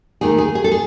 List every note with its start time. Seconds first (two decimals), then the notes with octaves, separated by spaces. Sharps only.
0.21 D#2 D#3 A3 G#4
0.38 G#4
0.55 G#4
0.64 A4
0.71 G#4